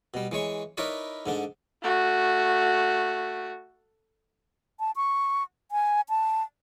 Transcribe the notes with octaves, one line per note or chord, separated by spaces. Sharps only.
B2 G3
E3 G#3 C#5 C#6
D#4 E4 A#4 B4 C#5 D5
G#2 D3 D4
A3 F#4
A5
C#6
G#5
A5